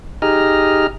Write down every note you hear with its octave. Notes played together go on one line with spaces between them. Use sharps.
D#4 G4 G#4 D#5 A#5 F6